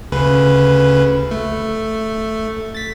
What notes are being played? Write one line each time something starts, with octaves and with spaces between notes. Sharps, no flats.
D2 C#3 B4
A3
A6 B6